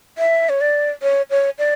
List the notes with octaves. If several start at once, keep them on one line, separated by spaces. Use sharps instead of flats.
E5
C#5
D5
C#5
C#5
D5